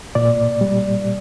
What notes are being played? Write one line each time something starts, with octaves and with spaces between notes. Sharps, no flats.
A#2 D5
G3